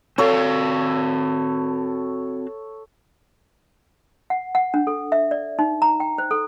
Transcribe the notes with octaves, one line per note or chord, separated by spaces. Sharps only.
C4 F#4 A4 C#5 F5
F#5
F#5
D4
A4
E5
D5
D#4
A#5
G5
C5
A4